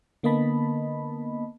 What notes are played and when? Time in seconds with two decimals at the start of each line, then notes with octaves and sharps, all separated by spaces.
0.23 D3 A#3 B3 D#5 A5 B5